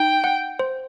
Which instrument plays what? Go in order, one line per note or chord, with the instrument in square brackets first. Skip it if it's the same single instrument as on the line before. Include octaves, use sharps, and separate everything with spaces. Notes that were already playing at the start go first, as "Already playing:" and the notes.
Already playing: [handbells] D#4 [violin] G5
[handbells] F#5
C5